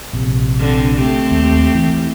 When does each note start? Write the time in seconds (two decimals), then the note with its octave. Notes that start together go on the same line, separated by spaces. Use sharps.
0.13 A#1 C3
0.59 D3 C4
0.96 A3 C4 G4
1.31 D#2
1.75 E3